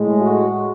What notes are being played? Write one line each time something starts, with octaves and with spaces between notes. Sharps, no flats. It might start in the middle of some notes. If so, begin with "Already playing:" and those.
Already playing: A2 G#3
F#4